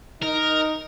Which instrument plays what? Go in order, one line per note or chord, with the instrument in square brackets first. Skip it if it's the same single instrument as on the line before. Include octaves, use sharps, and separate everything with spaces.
[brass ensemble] D#4 [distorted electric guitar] A#4